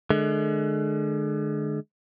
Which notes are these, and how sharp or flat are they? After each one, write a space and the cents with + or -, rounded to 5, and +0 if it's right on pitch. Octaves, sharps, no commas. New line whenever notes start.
D3 +35 G#3 +35